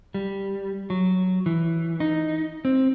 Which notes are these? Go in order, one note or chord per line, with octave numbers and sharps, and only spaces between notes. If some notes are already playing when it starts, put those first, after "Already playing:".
G3
F#3
E3
D#4
C4